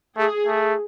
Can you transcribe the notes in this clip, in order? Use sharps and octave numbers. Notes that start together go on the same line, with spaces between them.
A3 G#4
A3